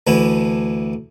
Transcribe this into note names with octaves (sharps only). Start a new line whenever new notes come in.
D2 D3 E3 E4